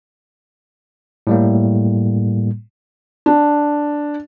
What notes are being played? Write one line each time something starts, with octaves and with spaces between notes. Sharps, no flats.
A2 G3 A#3
D4